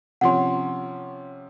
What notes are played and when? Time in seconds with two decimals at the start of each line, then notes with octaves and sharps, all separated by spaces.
0.21 C3 F3 C#4 F#5 C6